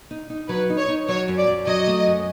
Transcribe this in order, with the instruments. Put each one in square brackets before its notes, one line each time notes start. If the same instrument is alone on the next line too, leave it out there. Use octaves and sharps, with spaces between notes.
[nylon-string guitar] D#4
D#4
[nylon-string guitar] F#3 [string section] B4
[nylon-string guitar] D#4
[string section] C#5
[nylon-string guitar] D#4
[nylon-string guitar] F#3 [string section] C#5
[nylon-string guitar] F#2
[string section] D5
[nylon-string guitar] F#2
[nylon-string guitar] F#3 [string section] D#5
[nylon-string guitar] A3
F#2